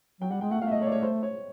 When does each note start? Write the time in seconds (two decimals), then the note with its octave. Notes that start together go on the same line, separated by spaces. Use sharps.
0.21 F#3 G5
0.31 G3 F#5
0.41 G#3 G5
0.51 A3 F#5
0.61 A3 F5
0.67 E5
0.71 D#5
0.82 C#5
0.87 D5
0.92 C#5
1.03 C5
1.23 C#5